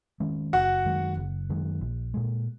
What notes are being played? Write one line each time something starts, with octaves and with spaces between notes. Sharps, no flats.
D#3 G#3 C#4
F#1 F#4 F#5
F#2 D#3 G#3
F#1
F#2 D#3 G#3
A#1
A#2 G#3